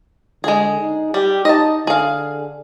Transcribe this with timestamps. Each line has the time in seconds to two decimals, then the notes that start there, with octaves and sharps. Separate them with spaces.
0.44 D3 G#3 G#4
0.81 D#4
1.14 G3 G4
1.45 D#4 D#5 A5
1.87 D3 G#4 F5